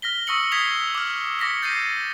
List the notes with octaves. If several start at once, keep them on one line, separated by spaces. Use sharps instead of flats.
F6 A#6 B6 G7
C#6 D#6 E6 A#6 C#7 F#7
D#6 G#6 B6 C7 F7 F#7
D6 F6
D6 A#6 B6 C#7
G6 A6 A#6 C7 D#7